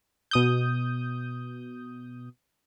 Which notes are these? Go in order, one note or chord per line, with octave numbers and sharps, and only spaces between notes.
B2 D#6 G6